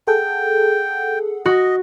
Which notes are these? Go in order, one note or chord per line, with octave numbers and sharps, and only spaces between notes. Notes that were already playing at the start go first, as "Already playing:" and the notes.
G#4 A4 F#5 G5
F#4 D#5